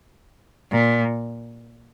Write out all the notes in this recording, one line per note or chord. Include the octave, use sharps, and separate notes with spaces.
A#2